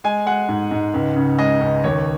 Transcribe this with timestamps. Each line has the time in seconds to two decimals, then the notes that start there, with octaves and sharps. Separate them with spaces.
0.04 G#3 G#5
0.26 G#3 F#5
0.49 G#2
0.71 G#2
0.94 C#2
1.16 C#3
1.38 G#3 D#5
1.61 C#2
1.84 D#2 C#5